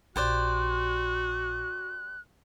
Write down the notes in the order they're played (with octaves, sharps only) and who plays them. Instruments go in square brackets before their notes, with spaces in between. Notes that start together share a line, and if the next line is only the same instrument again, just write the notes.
[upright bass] A#1 [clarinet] F#4 [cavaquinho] G4 C5 D5 [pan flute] F#6